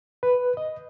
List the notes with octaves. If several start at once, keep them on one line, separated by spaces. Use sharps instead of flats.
B4
D#5